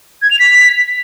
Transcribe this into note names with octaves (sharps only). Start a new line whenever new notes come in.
G#6
F7
B6